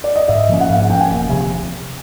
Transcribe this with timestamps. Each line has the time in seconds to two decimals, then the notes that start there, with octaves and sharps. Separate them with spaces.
0.04 D5
0.16 D#5
0.28 G#2 E5
0.49 F3 A#3 C#4
0.60 F#5
0.69 G#2 F5
0.80 F#5
0.89 F3 A#3 C#4 G5
1.00 G#5
1.11 E1
1.31 D2 C3 F3